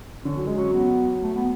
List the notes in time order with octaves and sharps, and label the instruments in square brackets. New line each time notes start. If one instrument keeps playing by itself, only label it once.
[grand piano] D3 [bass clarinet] C#4
[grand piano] F#3
G#3
[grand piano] F#3 [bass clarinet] C#4
[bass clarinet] B3
A3
B3